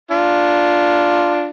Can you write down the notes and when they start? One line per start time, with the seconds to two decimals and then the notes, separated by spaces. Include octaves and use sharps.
0.11 D4 F4